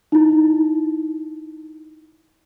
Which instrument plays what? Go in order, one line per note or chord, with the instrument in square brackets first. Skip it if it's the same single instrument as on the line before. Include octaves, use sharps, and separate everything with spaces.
[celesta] D#4 E4